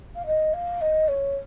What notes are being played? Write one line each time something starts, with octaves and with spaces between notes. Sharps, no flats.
F5
D#5
F5
D#5
C#5